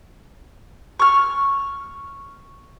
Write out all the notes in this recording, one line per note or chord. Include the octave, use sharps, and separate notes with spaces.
C#6 F6